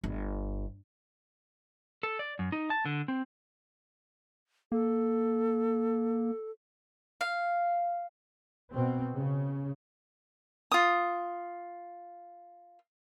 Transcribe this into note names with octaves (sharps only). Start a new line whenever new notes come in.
G1
A4
D5
F#2
D#4
A5
D3
C4
A#3 A4
F5
B2 C4
C#3
F4 D#6